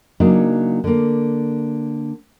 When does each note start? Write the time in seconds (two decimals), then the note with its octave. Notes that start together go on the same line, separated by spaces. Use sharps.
0.20 C#3 F#3 A#3 D4 D#4
0.84 D3 A#3